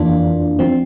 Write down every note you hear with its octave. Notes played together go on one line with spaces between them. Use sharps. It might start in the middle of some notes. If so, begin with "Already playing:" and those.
Already playing: F2 E3 A#3 D4 F4
F3 C4